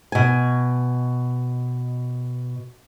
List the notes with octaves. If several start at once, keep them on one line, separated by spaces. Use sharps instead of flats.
B2 G#5